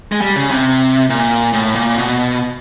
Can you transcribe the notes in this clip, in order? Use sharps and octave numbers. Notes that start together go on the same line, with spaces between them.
G#3
G3
C#3
C3
A#2
A2
A#2
B2